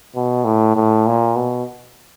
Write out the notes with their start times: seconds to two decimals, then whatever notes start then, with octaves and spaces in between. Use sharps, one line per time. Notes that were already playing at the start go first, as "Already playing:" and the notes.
0.16 B2
0.45 A2
0.76 A2
1.07 A#2
1.36 B2